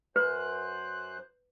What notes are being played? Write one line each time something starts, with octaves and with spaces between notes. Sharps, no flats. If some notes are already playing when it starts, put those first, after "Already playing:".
F#2 B4 C5 F#6